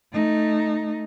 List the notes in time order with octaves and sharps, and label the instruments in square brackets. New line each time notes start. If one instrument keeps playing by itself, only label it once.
[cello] A3 D#4